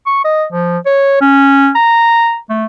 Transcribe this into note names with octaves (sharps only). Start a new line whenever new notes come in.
C#6
D#5
F3
C#5
C#4
A#5
A3